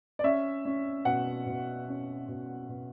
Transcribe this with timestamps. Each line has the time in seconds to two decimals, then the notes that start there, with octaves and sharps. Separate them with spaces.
0.19 D5
0.24 C#4 E5
0.65 C#4
1.05 B2 F#5
1.46 B2
1.88 C#4
2.28 B2
2.69 B2